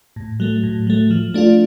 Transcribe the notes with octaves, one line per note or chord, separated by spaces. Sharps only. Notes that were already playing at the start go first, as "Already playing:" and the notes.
A2
F#3 A3
A2
F#3 A3
F3
A3 D4 F4